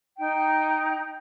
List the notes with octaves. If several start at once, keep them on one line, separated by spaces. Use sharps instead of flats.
D#4 G5